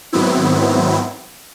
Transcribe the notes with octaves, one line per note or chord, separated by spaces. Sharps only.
G#2 D#3 F#3 B3 C4 E4